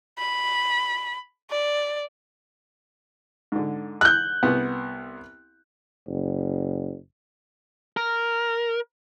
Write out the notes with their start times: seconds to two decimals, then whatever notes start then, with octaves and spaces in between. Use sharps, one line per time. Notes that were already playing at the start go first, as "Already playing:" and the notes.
0.18 B5
1.51 D5
3.52 G#2 D3
4.01 F#6 G6
4.43 C2 B3
6.07 F#1
7.97 A#4